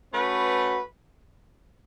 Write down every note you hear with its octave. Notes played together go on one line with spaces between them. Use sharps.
A3 C#4 F#4 B4